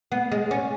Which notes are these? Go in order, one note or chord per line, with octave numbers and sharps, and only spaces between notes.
B3
G#3
C#4